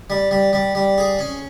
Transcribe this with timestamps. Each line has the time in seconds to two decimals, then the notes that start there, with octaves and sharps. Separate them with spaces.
0.10 G3
0.31 G3
0.53 G3
0.75 G3
0.98 G#4
1.19 C#4